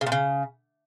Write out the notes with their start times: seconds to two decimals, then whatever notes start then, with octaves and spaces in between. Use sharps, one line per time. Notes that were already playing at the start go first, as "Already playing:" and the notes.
0.01 C#3
0.07 A#2
0.12 C#3